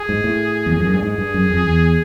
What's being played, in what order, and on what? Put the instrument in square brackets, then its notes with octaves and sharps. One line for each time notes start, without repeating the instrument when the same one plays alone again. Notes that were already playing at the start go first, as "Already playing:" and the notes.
Already playing: [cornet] G#4
[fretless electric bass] G#2
A2
E2
F2
F#2
G2
[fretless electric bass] G#2 [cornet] G#4
[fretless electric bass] G2
F#2
F2
E2